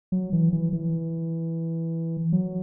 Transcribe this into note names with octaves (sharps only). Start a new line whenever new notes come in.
F#3
E3
E3
E3
F#3